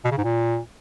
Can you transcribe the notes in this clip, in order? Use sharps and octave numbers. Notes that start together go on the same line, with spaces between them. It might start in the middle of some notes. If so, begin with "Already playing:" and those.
B2
C#3
G#2
A#2